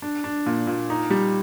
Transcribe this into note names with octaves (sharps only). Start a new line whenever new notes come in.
D4
D4
A#2
A#2
D#4
G3